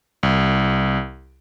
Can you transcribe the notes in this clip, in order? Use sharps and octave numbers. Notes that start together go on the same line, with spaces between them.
C2